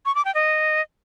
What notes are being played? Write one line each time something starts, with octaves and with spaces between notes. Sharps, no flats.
C#6
D6
G5
D#5